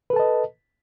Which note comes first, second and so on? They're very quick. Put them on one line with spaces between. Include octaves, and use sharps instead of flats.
B4 A4 A5 D#5